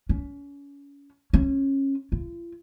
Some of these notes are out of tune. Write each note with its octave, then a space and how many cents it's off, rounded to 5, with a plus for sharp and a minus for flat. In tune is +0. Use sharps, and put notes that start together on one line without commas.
C#4 +30
C#4 -25
F4 -45